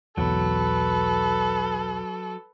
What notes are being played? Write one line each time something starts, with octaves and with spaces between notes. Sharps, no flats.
B1 E2 F#3 A4 B4